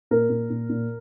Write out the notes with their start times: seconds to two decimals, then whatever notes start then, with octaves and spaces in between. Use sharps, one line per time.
0.11 A#2 A#4
0.30 A#2
0.50 A#2
0.69 A#2